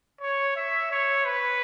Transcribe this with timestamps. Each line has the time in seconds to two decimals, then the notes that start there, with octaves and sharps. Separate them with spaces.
0.21 C#5
0.56 E5
0.91 C#5
1.26 B4